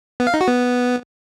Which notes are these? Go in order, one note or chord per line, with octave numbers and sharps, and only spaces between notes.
B3
F5
D#4
F#4
B3